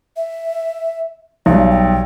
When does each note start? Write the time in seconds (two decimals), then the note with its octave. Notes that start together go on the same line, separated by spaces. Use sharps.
0.17 E5
1.46 B1 G3 F5
1.71 G5